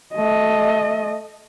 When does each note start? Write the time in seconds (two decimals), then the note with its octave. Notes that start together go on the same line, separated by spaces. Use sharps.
0.15 A3 D#5